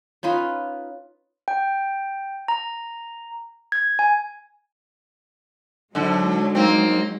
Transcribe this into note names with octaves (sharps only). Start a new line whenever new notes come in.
C#4 D#4 F4 B4
G5
A#5
G#6
G#5
G#2 D3 F#3 G#3
A#3 C4 D#4